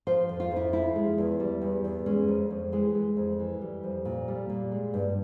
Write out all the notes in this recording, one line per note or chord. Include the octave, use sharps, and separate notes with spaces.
F3 C5
F2
F4
F2
E4
F3 E4
G#3
E2
G3
E2
E2
G#3 C#4
F2
F2
E3 G#3
G#3
F2
E3
G3
F2
A#2
G3
A#2
G#3
G2